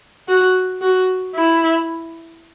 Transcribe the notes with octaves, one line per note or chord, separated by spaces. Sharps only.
F#4
F#4
E4